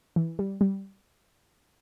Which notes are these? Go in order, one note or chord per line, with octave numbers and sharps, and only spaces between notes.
E3
G3
G3